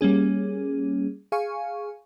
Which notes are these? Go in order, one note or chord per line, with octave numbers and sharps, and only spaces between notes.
G3 A#3 C#4 G#4
G#4 F5 G#5 C#6